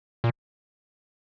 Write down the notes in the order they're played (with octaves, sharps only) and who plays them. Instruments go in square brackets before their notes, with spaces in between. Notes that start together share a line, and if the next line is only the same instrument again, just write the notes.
[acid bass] A#2